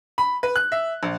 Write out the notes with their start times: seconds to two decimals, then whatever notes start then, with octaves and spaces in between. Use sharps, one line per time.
0.18 B5
0.43 B4
0.56 F#6
0.72 E5
1.03 A#1